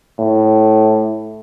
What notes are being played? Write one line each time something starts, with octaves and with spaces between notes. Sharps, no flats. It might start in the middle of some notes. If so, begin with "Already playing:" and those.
A2